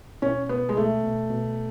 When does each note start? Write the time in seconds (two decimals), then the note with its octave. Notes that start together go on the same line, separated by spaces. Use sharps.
0.22 B2 C#4
0.49 B2 B3
0.69 G#3
0.76 B2 A3
1.04 B2
1.30 B2